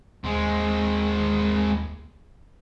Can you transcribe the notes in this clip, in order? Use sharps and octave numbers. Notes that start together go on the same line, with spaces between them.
D#2 G#3 C4